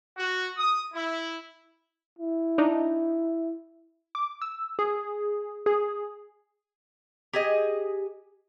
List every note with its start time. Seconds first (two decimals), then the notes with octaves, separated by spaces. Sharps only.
0.17 F#4
0.57 D#6
0.94 E4
2.19 E4
2.58 D4 D#4
4.15 D6
4.42 E6
4.79 G#4
5.66 G#4
7.33 G4 G#4 D#5